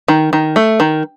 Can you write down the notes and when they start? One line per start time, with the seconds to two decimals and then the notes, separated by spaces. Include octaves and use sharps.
0.08 D#3
0.33 D#3
0.56 A3
0.80 D#3